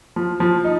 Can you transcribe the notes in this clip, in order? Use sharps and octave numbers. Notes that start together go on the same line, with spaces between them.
F3
F3
D#4